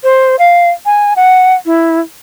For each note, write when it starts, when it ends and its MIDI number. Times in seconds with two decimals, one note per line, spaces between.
0.04 0.36 72
0.39 0.70 77
0.86 1.13 80
1.16 1.55 78
1.66 2.00 64